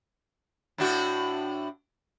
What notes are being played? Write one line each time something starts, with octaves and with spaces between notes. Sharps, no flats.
A2 D4 F#4